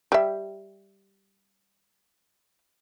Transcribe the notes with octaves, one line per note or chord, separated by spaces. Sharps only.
G3 E5